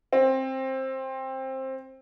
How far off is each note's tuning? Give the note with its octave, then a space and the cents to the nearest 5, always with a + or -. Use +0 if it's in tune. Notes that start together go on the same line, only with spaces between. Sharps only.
C4 +15